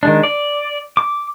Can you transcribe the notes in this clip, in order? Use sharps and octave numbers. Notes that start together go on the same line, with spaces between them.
D#3 G#3 D4
D5
D6